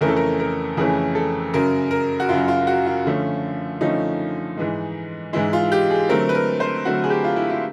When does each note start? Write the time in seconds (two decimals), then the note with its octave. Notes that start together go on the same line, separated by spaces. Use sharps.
0.01 F2 C#3 E3 A3 C#4 A#4
0.08 A4
0.16 A#4
0.40 A#4
0.77 F2 C#3 E3 A3 C#4 G#4
1.15 A4
1.53 F#2 C#3 F#3 A#4
1.91 A#4
2.20 F#4
2.29 F#2 C#3 F#3 F4
2.48 F4
2.67 F#4
2.86 F4
3.05 D3 F3 A3 C#4
3.81 D3 F3 A3 C#4 D#4
4.57 G#2 E3 G#3
5.33 G#2 E3 G#3 E4
5.53 F4
5.72 G4
5.90 G#4
6.09 D3 F#3 A3 C4 A#4
6.29 B4
6.35 A#4
6.60 C5
6.85 D3 F#3 A3 C4 F#4
7.04 G#4
7.10 G4
7.24 F4
7.36 E4
7.50 E4